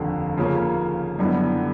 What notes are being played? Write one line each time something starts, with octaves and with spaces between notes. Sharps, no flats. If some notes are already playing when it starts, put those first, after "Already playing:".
Already playing: F1 D#2 D3
C#3 F3 A#3 C#4
F#2 D3 G3 B3 E4